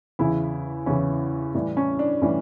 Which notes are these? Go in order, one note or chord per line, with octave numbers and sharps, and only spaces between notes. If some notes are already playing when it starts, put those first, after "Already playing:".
E2 C#3 E3 E4
E2 C#3 E3 C#4
A2 E3 G3
C#4
D4
A2 E3 G3 C#4